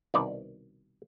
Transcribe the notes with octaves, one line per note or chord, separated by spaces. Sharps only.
C2 B2 D#3 D5